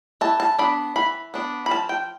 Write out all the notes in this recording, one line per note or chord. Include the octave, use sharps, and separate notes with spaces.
E3 A5
A5
B3 D4 B5
E3 B5
B3 D4
B5
F3 A5
G5